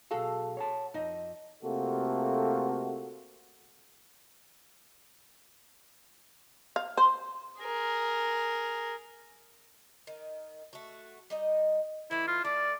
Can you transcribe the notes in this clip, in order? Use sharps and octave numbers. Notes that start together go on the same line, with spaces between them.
B1 F#4 G#4 A4 F5
C#5 F#5 A5
F2 D#4 D#5
C3 A3 A#3 F4 F#4 A4
F5
C5
G#4 A#4
D#3
A3 F#4
G3 D#4 D#5
E3 A3 E4
F4
A3 D5